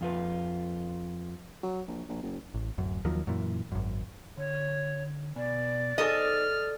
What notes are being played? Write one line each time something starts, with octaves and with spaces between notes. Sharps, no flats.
F2 F4 B4
F#3
A#1
A#1
F#1
A1
D1 F#2
D#2 D#3 F3 F#3
F#2 A#2 E3
G#1 F#2
D3 C#5
B2 B3 D5 G#5
D#4 G#4 A4 C5 D#5 F6